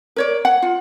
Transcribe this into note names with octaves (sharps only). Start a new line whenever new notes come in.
A#4 C#5 D5
F#5
F4